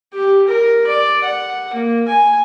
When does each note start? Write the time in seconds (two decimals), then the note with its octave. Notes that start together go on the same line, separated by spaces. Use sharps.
0.14 G4
0.48 A#4
0.87 D5
1.24 F#5
1.74 A#3
2.08 G#5